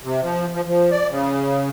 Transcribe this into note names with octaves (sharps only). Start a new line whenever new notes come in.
C3
F3
F3
F3
D5
C#3